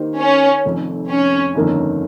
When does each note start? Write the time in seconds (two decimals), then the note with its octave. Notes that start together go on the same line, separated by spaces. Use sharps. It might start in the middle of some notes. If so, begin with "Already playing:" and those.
Already playing: D#3 A#3 D#4 G4 C5
0.19 C#4
0.65 F1 F2 D#3
1.10 C#4
1.55 G1 F2 D#3 A#3 C#4